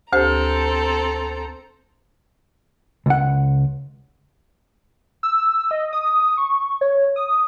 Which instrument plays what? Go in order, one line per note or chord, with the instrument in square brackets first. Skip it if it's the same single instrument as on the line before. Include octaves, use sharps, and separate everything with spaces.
[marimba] D2 G4 C5 [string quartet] C4 A4 A#5
[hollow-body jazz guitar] C#2 F#5
[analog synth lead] E6
D#5
D#6
C#6
C#5
D#6